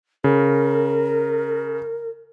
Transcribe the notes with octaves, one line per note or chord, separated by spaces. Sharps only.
C#3 A#4